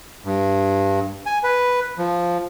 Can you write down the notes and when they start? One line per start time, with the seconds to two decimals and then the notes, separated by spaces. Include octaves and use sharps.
0.25 G2
1.26 G#5
1.44 B4
1.98 F3